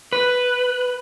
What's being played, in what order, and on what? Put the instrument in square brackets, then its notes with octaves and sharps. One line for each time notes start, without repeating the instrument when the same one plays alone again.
[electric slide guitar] B4